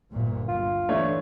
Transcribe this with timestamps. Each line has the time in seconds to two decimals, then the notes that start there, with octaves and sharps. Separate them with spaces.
0.12 G1 D2 A#2
0.48 G1 F4
0.89 E3 A3 D4 C#5